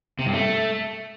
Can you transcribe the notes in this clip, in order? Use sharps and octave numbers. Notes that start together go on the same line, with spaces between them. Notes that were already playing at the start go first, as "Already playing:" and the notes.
C3
G2
A3